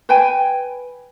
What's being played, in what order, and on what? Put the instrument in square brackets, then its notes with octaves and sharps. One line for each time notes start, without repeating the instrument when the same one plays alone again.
[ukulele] B4 G5 G#5